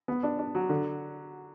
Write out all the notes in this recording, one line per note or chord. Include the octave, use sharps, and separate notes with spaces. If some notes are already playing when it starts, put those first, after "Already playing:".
B3
D4
D4
F#3
D3